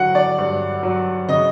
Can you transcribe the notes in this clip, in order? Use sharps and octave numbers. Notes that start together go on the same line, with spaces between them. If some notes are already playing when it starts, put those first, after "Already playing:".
Already playing: D3 F#3 F#5
D5
G2
F#3
C#3 D#5